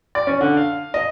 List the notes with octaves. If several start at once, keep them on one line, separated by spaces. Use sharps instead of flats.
D5
C#4
D3
F5
D#5